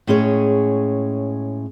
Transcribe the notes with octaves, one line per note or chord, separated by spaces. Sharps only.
A2 G#3 C#4 G#4 C#5